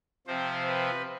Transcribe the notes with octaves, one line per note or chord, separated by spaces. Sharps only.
C3 F3 C4 C5
B4